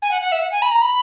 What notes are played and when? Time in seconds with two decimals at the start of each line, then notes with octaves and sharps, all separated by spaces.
0.02 G#5
0.11 F#5
0.21 F#5
0.32 E5
0.41 F#5
0.52 G#5
0.62 B5
0.71 A#5
0.81 B5